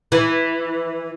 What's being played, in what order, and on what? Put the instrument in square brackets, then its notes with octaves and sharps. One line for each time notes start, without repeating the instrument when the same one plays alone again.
[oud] E3